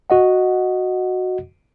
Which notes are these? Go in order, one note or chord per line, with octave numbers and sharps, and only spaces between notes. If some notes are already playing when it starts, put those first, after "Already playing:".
F#4 D#5 F#5